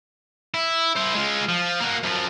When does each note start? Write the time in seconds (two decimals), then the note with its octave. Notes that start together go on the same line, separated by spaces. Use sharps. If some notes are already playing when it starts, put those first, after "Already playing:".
0.54 E4
0.96 E4 C5
1.14 G#3 F4
1.49 F3
1.80 A#3 F#4
2.03 F#2 F3